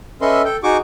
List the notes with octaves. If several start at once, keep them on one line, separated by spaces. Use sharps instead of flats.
C#4 A4 B4 D#5 E5 C6
A4 G5
D#4 F#4 G#4 C#6 D6